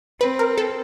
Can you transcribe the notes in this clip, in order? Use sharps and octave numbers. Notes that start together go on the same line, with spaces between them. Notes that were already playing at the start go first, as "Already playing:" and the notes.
C4 B4
A#4
A4